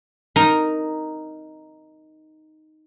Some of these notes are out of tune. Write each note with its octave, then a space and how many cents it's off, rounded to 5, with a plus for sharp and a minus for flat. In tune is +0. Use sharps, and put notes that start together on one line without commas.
D#4 +0 A#4 +0